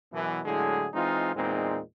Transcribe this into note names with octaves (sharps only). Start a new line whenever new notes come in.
F#2 B2 E3
A2 D3 F#3 G#3 E4 G#4
E3 G#3 C4 D#4 F4
E2 A#2 G#3 C4 D#4